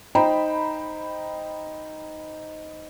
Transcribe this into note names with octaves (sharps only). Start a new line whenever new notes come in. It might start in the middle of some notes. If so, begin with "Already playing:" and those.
D#4 C5 G5 A#5 B5